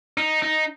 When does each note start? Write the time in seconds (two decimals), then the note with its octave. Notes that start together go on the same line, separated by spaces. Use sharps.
0.18 D#4
0.42 D#4